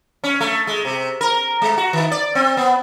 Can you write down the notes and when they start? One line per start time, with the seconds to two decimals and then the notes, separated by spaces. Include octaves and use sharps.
0.24 C#4
0.41 A3
0.67 G#3
0.85 C3
1.21 A#4
1.62 G#3
1.77 F#4
1.93 D#3
2.12 D5
2.35 C4
2.57 B3